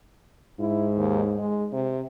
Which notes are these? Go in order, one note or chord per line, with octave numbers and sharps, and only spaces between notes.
G#2 E4
D#2
G#3
C3